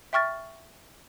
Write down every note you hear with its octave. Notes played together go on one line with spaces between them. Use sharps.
E5 G5 C#6 F6 A6